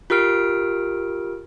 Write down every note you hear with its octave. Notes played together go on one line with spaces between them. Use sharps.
F4 G4 A#4 F6 D7